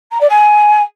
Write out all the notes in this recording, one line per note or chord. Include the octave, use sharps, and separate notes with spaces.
A#5
D5
G#5